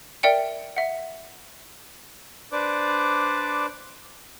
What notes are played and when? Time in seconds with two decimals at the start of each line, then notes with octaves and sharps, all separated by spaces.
0.23 A#4 D5 E5 G5 C#7
0.77 E5 F#5
2.52 D4 B4 C5 D5 D6